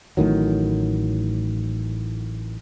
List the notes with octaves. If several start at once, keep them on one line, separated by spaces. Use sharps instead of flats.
A1 A2 D#3 F#3